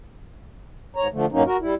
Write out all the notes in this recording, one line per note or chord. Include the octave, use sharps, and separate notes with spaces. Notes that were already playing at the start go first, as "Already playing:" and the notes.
G#2 C#5 A#5
D3 F3 A3
G2 A#2 F#3 A#3 C#4 D#4
F#4 A#4
G3 E4